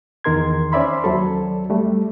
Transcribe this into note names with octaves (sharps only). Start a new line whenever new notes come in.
E2 D#3 D#4 A#4 C6 G#6
C#4 C5 D5 E5 B5 C6
D#2 F#3 A4
G3 A3